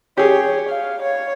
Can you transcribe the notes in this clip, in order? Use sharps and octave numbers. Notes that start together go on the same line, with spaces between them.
G4 G#4 C#5
F5
C#5